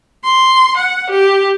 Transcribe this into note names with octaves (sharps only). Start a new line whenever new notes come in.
C6
F#5
G4